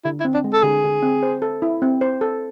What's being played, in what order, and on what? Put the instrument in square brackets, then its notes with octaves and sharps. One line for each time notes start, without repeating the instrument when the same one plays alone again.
[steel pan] D3 [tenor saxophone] E4
[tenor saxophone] E4
[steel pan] C4
[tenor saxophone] D4
[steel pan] G#3
[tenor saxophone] A4
[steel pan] D3 [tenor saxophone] G#4
[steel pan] D3
C4
C5
A4
E4
C4
C5
A4